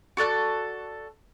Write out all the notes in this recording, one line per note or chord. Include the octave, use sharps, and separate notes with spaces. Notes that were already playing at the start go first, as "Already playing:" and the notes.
F#4 A4 D5 F#6